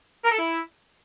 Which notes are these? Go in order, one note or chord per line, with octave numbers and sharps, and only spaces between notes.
A#4
A4
E4